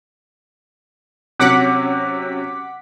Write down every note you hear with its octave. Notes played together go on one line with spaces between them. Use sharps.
C3 F#3 C#4 F#5 D6 B6